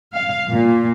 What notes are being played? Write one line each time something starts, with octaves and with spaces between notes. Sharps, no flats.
F5
A#2